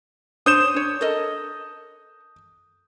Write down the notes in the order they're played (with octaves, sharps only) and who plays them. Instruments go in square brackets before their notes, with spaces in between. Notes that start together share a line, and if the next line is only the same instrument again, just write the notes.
[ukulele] D4 C5 C#5 [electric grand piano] D#6 G6 E7
[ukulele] D4 C#5
A4 A#4 D#5